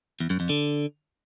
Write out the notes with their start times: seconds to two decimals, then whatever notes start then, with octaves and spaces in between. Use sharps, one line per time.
0.20 E2
0.30 F#2
0.40 F2
0.49 D3